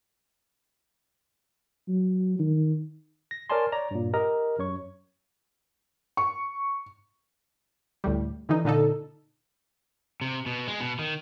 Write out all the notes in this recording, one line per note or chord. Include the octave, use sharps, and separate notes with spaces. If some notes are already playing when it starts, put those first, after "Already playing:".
F#3
D#3
A#6
A#4 C#5 D5 G#5 A5 C6
C#5 D5 A#5
G2 A#2
G4 A#4 D#5 A#5
F#2 C#5 C#6
C#6
D2 A2 G3
D3 E3 D#4
A#2 D3 D#4 A4
C3
B2
G#3
B2
D#3